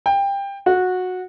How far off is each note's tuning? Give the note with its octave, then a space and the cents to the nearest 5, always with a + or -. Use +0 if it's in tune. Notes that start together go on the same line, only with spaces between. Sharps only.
G5 +20
F#4 -15